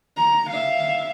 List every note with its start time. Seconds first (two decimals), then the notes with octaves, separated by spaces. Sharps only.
0.17 A#5
0.50 E5 F5